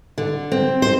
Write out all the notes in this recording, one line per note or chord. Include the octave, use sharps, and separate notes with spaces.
D3
C4
C5